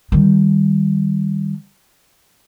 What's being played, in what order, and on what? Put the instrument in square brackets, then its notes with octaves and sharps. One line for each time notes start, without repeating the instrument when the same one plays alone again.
[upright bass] D#3 G3